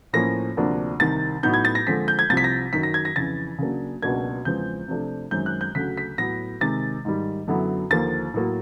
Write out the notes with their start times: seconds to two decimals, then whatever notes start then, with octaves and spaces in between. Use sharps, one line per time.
0.13 A2 F3 A#3 C#4 A#6
0.57 D2 C3 F3 A#3 D4
1.00 C2 C3 D#3 A6
1.43 A2 F#3 B3 D#4 G6
1.54 G#6
1.65 A6
1.75 A#6
1.87 D3 F3 G#3 C4 B6
2.08 G6
2.19 G#6
2.29 C2 C3 F3 A6
2.37 B6
2.44 A#6
2.73 F#2 D#3 F#3 B6
2.83 A#6
2.94 G#6
3.05 A#6
3.16 F2 C#3 E3 A6
3.58 C#3 F#3 A#3 D4
4.02 C#2 B2 F#3 A#3 D4 G#6
4.45 E2 C#3 F3 G#3 C4 G6
4.88 C3 F3 A3 D4 F4
5.31 F#2 D#3 G#3 C4 G6
5.46 F#6
5.61 G6
5.75 D2 C#3 F#3 A3 B6
5.97 B6
6.18 A2 F#3 B3 A#6
6.61 C3 D#3 G#3 A6
7.05 G#2 D#3 G3
7.47 F#2 D3 F#3 B3 E4
7.90 D#2 D3 F3 A#3 A6
8.34 A2 F#3 A#3